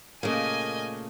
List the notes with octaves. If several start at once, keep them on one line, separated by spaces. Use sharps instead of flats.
A#2 C#3 A3 A#3 D#5 G#5